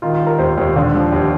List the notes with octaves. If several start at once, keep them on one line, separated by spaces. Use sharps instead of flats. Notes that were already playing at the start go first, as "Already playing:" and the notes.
D#3 F4
F4
G3
A#4
D#2 C5
D#2
D3
F3
D#2